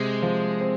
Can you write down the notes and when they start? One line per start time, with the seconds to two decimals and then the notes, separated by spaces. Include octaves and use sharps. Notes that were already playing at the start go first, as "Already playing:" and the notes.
Already playing: C3 G#3
0.22 F3
0.61 C4